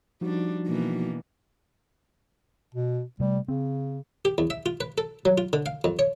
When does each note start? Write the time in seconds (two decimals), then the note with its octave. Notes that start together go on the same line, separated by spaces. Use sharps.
0.21 F3 G3 D4 D#4 F#4
0.67 B2 E3 A#3
2.74 B2
3.20 C3 G3 A3
3.48 C#3 C4
4.25 G4
4.38 E2
4.50 E5
4.66 F4
4.81 B4
4.98 A4
5.25 F#3
5.38 F4
5.53 D3
5.66 F5
5.84 F2
5.99 C#5